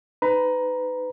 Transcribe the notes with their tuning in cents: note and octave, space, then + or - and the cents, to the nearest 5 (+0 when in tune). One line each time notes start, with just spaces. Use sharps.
D#4 +0 B4 +30 A#5 +15